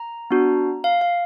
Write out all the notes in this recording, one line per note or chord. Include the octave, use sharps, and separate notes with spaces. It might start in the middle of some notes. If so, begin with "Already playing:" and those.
Already playing: A#5
B3 D4 F#4
F5
F5